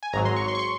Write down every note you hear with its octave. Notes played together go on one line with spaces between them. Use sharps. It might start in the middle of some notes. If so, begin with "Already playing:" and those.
G#5
G#1 G#2 F#3 A#5
C6
C#6
C6
C#6
C6